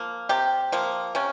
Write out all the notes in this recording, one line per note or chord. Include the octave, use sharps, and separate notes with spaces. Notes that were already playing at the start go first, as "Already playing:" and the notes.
Already playing: F3 A#3
C3 G4
F3 A#3
C3 C#4